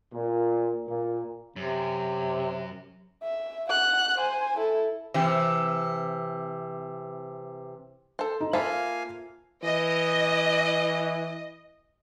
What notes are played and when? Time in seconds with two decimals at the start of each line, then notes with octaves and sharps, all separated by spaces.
0.13 A#2
0.89 A#2
1.56 F#2 C3
3.23 E5
3.70 F#5 F#6
4.18 C5 G#5
4.57 E4 A4
5.14 C3 E3
8.19 A4 C5
8.41 D#4
8.53 A#3 F4 A4 C5 E5 F5 G#5 B5
9.63 E3 D#5